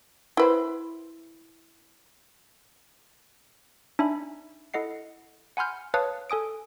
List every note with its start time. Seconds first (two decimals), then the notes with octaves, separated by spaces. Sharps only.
0.37 E4 B4 C5
3.99 D4 D#4 E5 G#5 B5
4.74 E4 A4 D#5 F#5 C7
5.57 F#5 G#5 B5 C6 F6 G6
5.94 B4 C#5 F5 A5 D#6
6.30 A4 G#5 D#6 D7